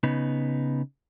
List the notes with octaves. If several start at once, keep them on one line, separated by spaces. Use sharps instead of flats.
C#3 B3 D#4